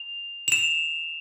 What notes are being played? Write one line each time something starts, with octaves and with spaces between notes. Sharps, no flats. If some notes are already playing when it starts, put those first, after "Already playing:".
Already playing: F7
F7
E7